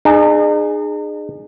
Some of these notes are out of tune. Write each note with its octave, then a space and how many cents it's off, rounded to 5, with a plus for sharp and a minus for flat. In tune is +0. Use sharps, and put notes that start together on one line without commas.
D#4 -45 G#4 +0